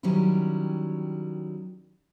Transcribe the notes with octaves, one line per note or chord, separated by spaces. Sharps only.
D#3 F#3 G3 C#4 E4